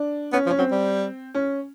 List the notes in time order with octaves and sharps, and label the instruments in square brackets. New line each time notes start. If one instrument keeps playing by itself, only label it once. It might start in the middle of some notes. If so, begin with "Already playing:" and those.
Already playing: [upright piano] D4
[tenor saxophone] B3 [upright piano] C#4
[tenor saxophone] F3
[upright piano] C#4
[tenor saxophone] F#3 [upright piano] C4
[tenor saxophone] G3
[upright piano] C#4